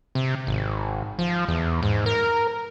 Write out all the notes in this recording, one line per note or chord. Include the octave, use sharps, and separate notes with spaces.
C3
G#1
F3
E2
G#2
A#4